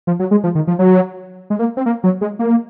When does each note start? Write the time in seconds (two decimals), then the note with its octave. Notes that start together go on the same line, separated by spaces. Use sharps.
0.07 F3
0.19 F#3
0.31 G#3
0.44 F3
0.55 D#3
0.67 F3
0.79 F#3
1.50 G#3
1.59 A#3
1.77 C4
1.86 A#3
2.04 F#3
2.21 G#3
2.39 A#3